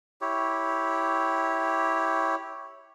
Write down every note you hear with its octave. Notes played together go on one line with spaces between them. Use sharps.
E4 G4 C#5